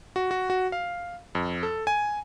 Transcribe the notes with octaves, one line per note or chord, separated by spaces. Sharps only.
F#4
F#4
F#4
F5
F2
A4
G#5